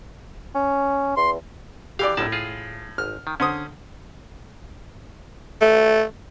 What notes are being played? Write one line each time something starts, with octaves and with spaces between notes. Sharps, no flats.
C#4
E2 C6
E3 G4 D5 F5
G1 F#2 A2 A5
F4 G#4
G#1 F6
D#3
D3 C#4 C5 D#6
A3